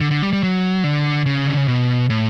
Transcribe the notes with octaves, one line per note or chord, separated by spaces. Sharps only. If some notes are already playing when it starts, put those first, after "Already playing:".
D3
D3
G3
G3
F#3
D3
C#3
D3
C#3
B2
A2